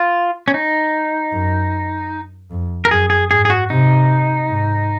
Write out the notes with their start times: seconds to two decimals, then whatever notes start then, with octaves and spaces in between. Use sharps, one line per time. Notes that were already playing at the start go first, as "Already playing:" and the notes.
Already playing: F4
0.48 C#4
0.54 D#4
1.33 F#2
2.51 F2
2.85 A#4
2.90 F#2 G#4
3.10 G#4
3.30 G#2 G#4
3.45 G#4
3.50 F#4
3.70 C3 D#4
4.48 G#2